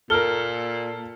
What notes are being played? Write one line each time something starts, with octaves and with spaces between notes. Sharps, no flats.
A#2 A4 A#4 F6 G7